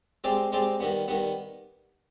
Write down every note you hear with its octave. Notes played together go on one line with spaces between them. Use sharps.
G#3 C4 G4 D5
G#3 C4 G4 D5
D#3 G3 B3
D#3 G3 B3